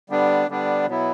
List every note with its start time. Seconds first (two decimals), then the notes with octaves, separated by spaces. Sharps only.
0.10 D3 G3 B3 D4
0.48 D3 G3 B3 D4
0.86 B2 F#3 B3 E4